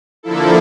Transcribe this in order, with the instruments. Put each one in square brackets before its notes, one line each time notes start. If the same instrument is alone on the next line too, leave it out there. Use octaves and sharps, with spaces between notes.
[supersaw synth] D3 F3 A#3 E4 A4